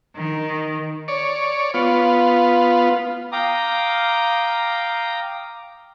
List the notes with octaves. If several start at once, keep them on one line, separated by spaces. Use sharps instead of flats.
D#3
C#5 D5
B3 F4
F5 G5 A#5 D6 D#6